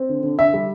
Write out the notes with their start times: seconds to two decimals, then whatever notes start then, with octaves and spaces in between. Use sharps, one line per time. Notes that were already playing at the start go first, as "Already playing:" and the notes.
Already playing: C4
0.09 D3
0.23 D3
0.38 D3 E5
0.53 G3